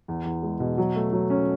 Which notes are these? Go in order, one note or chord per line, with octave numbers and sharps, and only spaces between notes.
E2
E2
G#3
B2
F#3
A3
F#3
C#4